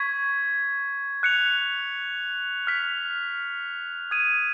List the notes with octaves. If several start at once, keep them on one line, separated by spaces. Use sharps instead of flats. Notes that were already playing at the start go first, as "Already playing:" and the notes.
Already playing: C#6 G#6 B6
F#6 C#7 F7
F6 B6 F7
D#6 G#6 D#7